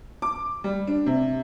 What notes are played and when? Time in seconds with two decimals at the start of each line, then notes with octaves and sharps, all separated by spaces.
0.22 D6
0.64 G3
0.87 D4
1.06 C3